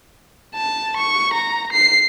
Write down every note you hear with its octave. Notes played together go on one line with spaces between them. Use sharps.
A5
C#6
A#5
C7